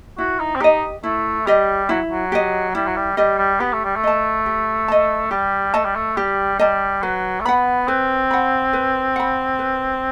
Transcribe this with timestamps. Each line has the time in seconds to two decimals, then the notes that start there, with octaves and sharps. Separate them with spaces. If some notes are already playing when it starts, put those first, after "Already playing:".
0.18 E4 F#4
0.39 D#4
0.56 C4
0.60 D#4 G4 D#5
1.03 A3 E4
1.47 G3 G4 D#5
1.89 F#3 E4
2.09 F#3
2.32 G4 D#5
2.75 G3 E4
2.86 F#3
2.96 G3
3.17 G3 G4 D#5
3.38 G3
3.60 B3 G4
3.73 A3
3.84 G3
3.96 A3
4.04 D#5 A5
4.46 G4
4.88 D#5 A5
5.31 G3 G4
5.74 A3 D#5 A5
5.85 G3
5.96 A3
6.17 G3 G4
6.59 G3 D#5 A5
7.02 F#3 B4
7.40 A3
7.45 B3 F#5 B5
7.88 C4 B4
8.31 F#5 B5
8.73 B4
9.16 F#5 B5
9.59 B4